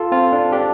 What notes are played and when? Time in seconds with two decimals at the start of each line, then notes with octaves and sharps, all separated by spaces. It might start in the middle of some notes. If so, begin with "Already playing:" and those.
Already playing: F4 A4
0.12 C4 F4
0.33 D4
0.52 D4 G4